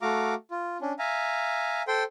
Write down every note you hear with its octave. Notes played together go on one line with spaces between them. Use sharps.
A3 F#4 F5 A#5 D6
F4
C#4 D4
E5 F5 G#5 A#5
A4 C5 G5 C6